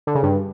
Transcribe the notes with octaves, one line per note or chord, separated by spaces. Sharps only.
D3
C#3
G2